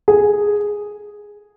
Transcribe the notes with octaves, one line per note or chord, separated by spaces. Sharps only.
G#4